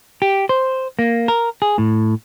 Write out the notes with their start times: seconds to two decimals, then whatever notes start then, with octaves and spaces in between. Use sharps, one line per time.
0.22 G4
0.49 C5
0.99 A#3
1.28 A#4
1.62 G#4
1.78 A2